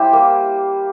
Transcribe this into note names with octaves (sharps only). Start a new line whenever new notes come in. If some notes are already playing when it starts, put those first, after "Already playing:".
Already playing: G3 E4 G4 C5
A#3